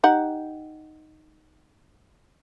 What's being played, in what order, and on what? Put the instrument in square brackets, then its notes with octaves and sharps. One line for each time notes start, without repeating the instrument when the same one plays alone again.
[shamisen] D#4 G4 F#5